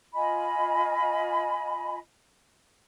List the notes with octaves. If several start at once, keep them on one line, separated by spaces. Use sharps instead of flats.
F4 D#5 G#5 B5